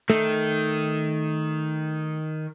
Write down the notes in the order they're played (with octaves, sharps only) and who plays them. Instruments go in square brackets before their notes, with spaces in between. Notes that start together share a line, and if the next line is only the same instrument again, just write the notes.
[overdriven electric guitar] D#3 [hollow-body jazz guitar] A3